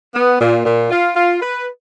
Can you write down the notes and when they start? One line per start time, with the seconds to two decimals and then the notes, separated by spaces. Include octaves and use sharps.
0.15 B3
0.40 A#2
0.65 A#2
0.90 F4
1.15 F4
1.41 B4